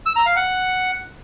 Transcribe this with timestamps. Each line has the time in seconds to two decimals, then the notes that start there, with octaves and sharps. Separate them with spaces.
0.06 E6
0.16 A#5
0.26 F5
0.36 F#5